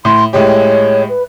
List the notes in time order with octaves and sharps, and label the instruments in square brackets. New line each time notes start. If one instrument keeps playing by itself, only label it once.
[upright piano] A2 [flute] C6
[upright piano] A2 G#3 G4 [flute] C#5
[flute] B4